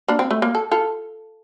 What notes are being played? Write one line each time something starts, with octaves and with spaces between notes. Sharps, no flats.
A#3 D4
C4
A3
A#3
A4
F4 A4